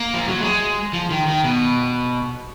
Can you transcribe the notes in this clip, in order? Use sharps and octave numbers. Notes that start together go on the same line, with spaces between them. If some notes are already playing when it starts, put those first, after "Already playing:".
Already playing: A#3
F3
F#3
G#3
F3
D#3
D#3
B2